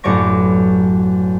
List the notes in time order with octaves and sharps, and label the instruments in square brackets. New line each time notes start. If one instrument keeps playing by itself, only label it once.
[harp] A1 F#2 B3 D5 C#6 A#6